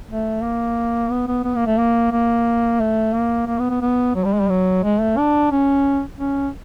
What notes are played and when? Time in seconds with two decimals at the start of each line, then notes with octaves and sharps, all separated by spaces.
0.09 A3
0.42 A#3
1.11 B3
1.27 B3
1.44 B3
1.56 A#3
1.66 A3
1.79 A#3
2.12 A#3
2.80 A3
3.13 A#3
3.47 A#3
3.59 B3
3.70 B3
3.81 B3
4.15 F#3
4.24 G3
4.33 G#3
4.41 G3
4.49 F#3
4.83 G#3
5.01 A3
5.17 D4
5.51 C#4
6.18 C#4